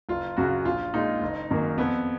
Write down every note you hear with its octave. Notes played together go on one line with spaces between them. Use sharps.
F#1 F4
F#2 C#3 F#4
A#1 F4
A#2 G#3 D#4
F#1
F#2 D#3 A#3
F2 B3